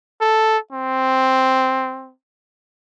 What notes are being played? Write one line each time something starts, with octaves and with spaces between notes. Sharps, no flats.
A4
C4